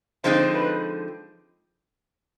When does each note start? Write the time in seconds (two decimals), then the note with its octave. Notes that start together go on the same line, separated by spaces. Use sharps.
0.24 D3 F3 G#3 C4 D#4 C5
0.54 B4